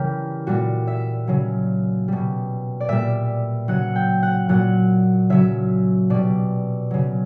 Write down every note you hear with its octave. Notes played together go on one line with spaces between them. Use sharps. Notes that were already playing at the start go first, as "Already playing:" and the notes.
Already playing: C#3 E3 G3 G4 A#4
A#2 G3 F#4
E5
C#3 F#3
B2 G3
D5
A#2 G3 E5
C#3 F#3 F#5
G5
F#5
A#2 F#3 F#5
C#3 F#3 E5
B2 G3 D5
C#3 F#3